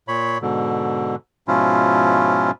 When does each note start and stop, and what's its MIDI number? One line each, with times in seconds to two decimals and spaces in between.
0.08 0.38 46
0.08 0.38 73
0.08 0.38 83
0.42 1.15 44
0.42 1.15 47
0.42 1.15 50
1.48 2.51 44
1.48 2.51 47
1.48 2.51 53
1.48 2.51 61
1.48 2.51 64
1.48 2.51 65